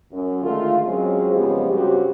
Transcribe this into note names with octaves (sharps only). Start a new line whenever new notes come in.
F#2
D3 D#3 G#3 A3 F4
F#3 G#3 C4 C#4 F4 G#4
F2 C#3 F3 G#3 B3 G4
G2 C#3 C4 F#4 G4